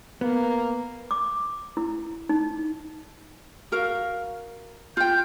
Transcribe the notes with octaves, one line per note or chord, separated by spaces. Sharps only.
A#3 B3
D6
E4
D#4
F#4 A#4 F5
F4 G5 G6